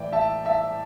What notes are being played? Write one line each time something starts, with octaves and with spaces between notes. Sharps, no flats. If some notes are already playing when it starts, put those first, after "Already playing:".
Already playing: A2 E3 D5 G5
E5 A5
E5 A5